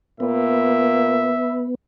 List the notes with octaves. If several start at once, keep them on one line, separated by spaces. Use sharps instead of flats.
A#2 B3 E5